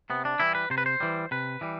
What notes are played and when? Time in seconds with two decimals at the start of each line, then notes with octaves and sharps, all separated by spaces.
0.10 C3 B3
0.25 D4
0.40 E3 G3 E4
0.55 B4
0.70 C3 C5
0.78 B4
0.86 C5
1.00 E3 G3
1.31 C3 B4
1.61 E3 G3